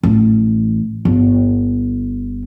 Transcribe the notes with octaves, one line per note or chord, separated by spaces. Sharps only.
A1
G1